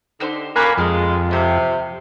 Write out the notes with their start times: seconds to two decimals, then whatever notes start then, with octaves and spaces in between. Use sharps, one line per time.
0.20 D3 D#4 G4 C5
0.56 F#2 D3 A#3 G4 A#4 G#5 B5 F#6
0.77 F2 G#3 G5 F6
1.31 C3 C#4 G4